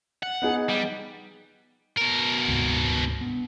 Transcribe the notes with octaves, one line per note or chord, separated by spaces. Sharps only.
F#5
B3 D#4 G#4
G3
B2 A#4
D2 G#2 C3
B3 D4